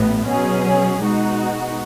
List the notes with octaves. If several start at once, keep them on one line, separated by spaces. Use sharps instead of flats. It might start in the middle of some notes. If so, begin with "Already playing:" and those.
Already playing: A1 A2 B3
B2 F#3 C#4 G#4
B2 G#3 D#4 F#4